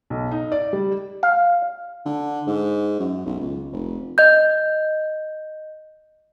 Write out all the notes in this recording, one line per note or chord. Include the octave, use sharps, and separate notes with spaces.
B1
D#4
D5
G3
F5
D3
G#2
F#2
B1
C#2
F1
D#5 G6